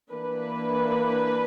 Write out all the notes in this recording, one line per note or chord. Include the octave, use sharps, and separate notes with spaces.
E3 A#3 D4 B4